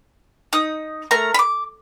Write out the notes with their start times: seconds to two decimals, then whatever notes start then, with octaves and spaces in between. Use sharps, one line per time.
0.53 D#4 D#6
1.11 A3 A#4 A#5
1.34 B5 D6